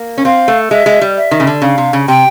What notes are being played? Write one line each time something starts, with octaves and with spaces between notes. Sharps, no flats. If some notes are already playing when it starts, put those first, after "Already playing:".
Already playing: A#3
C#4
C4 F5
A3
G#3 E5
G#3
G3
E5
D#3
C#3
D3
C#3 F5
C3
C#3
C3 G5